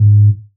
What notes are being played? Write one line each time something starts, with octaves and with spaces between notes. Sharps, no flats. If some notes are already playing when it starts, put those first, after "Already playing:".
Already playing: G#2